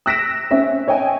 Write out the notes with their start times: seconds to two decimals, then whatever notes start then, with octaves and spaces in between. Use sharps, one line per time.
0.06 E6 F#6 A#6 B6 D7 E7
0.51 C4 C#4 E5
0.88 C#5 D#5 G5 G#5